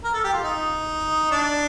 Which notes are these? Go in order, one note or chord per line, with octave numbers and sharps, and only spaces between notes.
A#4
A4
G4
F4
D#4
D4